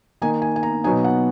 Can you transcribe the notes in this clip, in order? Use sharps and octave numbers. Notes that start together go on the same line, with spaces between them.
D#3 A#3 D#4 G#5
G#5
G#5
A#5
B2 F#3 B3 D#4 G#5
F#5